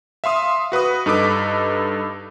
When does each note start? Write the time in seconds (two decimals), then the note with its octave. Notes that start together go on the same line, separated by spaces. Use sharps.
0.24 E5 F5 C6 D#6
0.72 F#4 B4 B5 D#6
1.06 G2 D#4 A4 B4 D6 B6